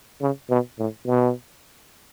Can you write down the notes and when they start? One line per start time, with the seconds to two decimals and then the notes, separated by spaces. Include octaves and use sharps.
0.21 C#3
0.50 B2
0.79 A2
1.06 B2